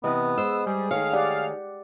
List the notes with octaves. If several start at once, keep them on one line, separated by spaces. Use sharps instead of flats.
C3 E3 B3 D#5
G#3 C5 D#5 E6
G3 G#4
D#3 A3 C#5 F5
G4 D5 F#5